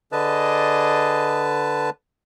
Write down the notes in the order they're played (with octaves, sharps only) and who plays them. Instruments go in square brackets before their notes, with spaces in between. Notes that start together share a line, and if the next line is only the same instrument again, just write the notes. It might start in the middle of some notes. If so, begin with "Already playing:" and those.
[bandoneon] D3 B4 A5 [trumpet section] G#4 D5 D#5